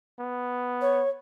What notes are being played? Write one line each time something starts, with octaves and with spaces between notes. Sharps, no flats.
B3
C#5